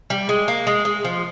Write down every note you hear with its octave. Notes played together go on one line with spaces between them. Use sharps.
G3
G#3
A#3
G#3
G#3
F3